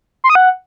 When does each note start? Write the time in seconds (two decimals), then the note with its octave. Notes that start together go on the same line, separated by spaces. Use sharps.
0.24 C6
0.30 D#6
0.35 F#5